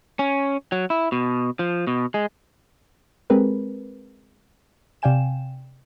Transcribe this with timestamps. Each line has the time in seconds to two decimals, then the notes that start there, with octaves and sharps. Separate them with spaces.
0.19 C#4
0.72 F#3
0.90 E4
1.12 B2
1.59 F3
1.87 B2
2.14 G#3
3.30 G#3 C4 G4 G#4 A#4 B4
5.02 C3 D5 F5 G5 G#5 E7